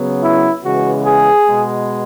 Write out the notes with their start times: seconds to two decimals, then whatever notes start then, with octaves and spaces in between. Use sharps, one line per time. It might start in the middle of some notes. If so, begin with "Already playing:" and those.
Already playing: C#3 F#3 B3
0.23 E4
0.64 C#3 E3 G#3 B3 F#4
1.05 G#4
1.46 B2 G#3 B3